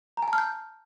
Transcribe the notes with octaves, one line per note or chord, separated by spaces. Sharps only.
A#5
G#5
A5
F6
G6